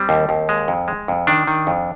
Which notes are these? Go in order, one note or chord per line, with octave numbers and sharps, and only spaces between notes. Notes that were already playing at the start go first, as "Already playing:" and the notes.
Already playing: G3 C4
D#2
D#2
G#3
F2
G#3
F2
D#3 D4
D#3
F2